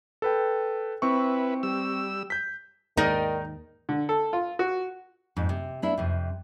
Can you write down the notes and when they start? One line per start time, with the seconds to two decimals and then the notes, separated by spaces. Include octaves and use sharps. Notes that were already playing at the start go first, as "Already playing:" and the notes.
0.22 A4 B4 G5
1.02 C4 E4 B4 C#6
1.63 G3 E6
2.30 G6 B6
2.97 D#2 G#2 D#3 D#4 A#4 D5 D#5
3.89 D3
4.09 A4
4.33 F4
4.59 F#4
5.36 F2 G#2
5.49 C3
5.82 B3 D4 E4
5.98 F2 C3